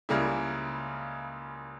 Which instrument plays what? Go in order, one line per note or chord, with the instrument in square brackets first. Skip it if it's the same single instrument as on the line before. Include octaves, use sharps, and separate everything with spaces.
[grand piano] C#2 C#3 G3 A#3 E4